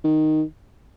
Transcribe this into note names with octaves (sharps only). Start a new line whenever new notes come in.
D#3